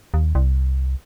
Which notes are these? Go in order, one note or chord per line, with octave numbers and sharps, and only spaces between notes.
D#2
C2